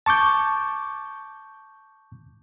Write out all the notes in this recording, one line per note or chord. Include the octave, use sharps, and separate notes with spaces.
A5 C#6 D6 G6